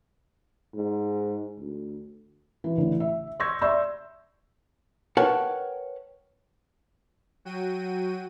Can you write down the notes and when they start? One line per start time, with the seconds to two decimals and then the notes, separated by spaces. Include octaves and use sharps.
0.74 G#2
1.59 D2
2.64 E3
2.77 A1 D3 E3
3.00 E5
3.40 C6 C#6 E6 G6 G#6 A#6
3.62 D5 E5 C6 C#6 E6 G6
5.17 A#4 B4 C#5 F#5 G5 A5
7.45 F#3 F#4 G5 D#7